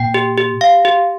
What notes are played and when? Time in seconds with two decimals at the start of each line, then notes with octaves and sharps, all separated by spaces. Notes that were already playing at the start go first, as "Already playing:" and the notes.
Already playing: A#2 G5
0.14 G4
0.38 G4
0.61 F5
0.85 G4